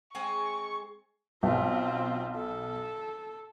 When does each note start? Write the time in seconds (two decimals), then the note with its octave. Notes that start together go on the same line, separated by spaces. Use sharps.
0.15 G#3 C4 G#5 C#6
1.43 B1 C4 F4
2.36 A4